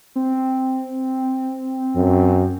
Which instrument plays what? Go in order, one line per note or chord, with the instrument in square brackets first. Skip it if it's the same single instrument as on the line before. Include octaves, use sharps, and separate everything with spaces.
[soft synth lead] C4
[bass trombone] F#2